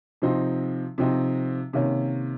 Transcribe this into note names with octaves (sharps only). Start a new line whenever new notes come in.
C3 F3 C4 D#4
C3 F3 C4 D#4
C3 D#3 A#3 C#4